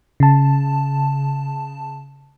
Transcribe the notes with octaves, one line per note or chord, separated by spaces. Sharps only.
C#3 A5